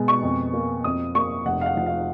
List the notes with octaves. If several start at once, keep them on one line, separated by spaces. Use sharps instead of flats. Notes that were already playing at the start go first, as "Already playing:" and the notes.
Already playing: B2 G#3
C#6
F2
A#3
F2 D#6
A#3 C#6
F1 F#5
F5
F#5
F3 F#5
F5